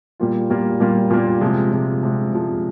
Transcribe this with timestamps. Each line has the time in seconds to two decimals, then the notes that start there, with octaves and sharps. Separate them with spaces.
0.20 A#2 G3 A#3 F4
0.50 A#2 G3 A#3 F4
0.80 A#2 G3 A#3 F4
1.10 A#2 G3 A#3 F4
1.41 C3 F3 G#3
1.72 C3 F3 G#3
2.03 C3 F3 G#3
2.33 C3 F3 G#3